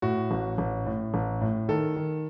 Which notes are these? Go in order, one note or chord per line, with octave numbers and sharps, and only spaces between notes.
A2 F#4
A1
A1
A2
A1
A2
D#3 A4
D#3